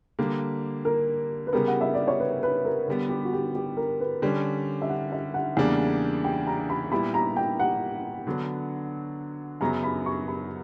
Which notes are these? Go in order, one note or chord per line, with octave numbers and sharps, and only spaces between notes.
D3 G3 A#3
A#4
B4
C#3 G3 B3 A#4
F#5
E5
D5
C#5
B4
B4
A#4
D3 G3 B3
G4
F#4
G4
G4
A#4
B4
D3 G3 C#4 D5
E5
F#5
E5
F#5
E2 C#3 G3 A#3 D4
G5
A#5
B5
A#2 G3 B3 E4 B5
A#5
G5
F#5
D3 F#3 B3 D4
F#2 C#3 F#3 B3 A#5
B5
C#6
B5